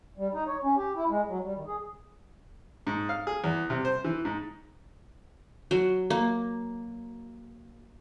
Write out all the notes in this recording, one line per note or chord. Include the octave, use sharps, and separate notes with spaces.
G3
D#4
C#5
C#4
G4
E4
G#3
F#3
G3
D#3
G#4
G#2
F5
G#4
E2
C3
C5
E3
G#2
F#3
A#3